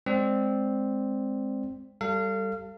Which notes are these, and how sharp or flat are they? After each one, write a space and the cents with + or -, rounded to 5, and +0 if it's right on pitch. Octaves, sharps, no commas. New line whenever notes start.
G#3 +0 C4 +0 D5 +0
G3 +0 A4 +30 F5 -25